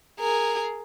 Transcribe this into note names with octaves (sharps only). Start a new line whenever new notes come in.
G#4 A#4